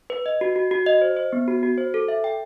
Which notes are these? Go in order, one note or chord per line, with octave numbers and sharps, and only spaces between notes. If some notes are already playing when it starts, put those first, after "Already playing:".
B4
D#5
F#4
F#4
F#4
D#5
C5
C5
B3
F#4
F#4
C5
A4
E5
G5